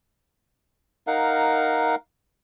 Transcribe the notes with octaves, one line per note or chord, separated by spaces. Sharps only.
D#4 A#4 F5 F#5